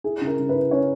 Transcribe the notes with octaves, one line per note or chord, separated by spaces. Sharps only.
E4 G#4
C#3
A#4
C#3
B4
E4
C#4 C#5